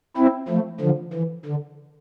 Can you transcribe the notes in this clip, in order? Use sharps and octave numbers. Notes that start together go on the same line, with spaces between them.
C4 E4
F3 A3
D3 F3
E3
D3